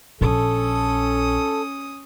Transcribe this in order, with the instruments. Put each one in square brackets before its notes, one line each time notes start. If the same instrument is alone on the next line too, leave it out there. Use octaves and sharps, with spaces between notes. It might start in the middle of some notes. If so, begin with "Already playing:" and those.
[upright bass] A#1 [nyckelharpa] C#4 D#6 [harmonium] A4